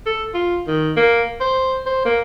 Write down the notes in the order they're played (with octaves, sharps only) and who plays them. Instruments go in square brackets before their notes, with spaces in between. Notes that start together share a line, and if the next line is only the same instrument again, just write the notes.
[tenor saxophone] A4
F4
D#3
A#3
C5
C5
A#3